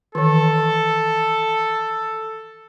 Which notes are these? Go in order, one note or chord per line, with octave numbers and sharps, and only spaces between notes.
D#3 E3 A4